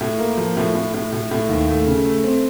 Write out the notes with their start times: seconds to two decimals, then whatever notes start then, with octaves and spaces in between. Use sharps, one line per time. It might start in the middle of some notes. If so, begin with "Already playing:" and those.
0.01 A2
0.19 A#3
0.37 F3
0.57 A2
0.75 A2
0.94 A2
1.12 A2
1.31 A2
1.49 D#2
1.68 A3
1.87 C#3
2.05 A3
2.24 C4